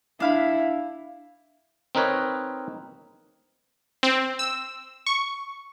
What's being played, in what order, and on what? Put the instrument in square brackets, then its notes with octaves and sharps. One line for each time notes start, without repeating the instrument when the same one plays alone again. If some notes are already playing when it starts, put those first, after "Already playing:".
[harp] D4 F5 B5 [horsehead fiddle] E4
[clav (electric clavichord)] C4 D#4 A#4 B4 C#5
[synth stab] C4
E6
C#6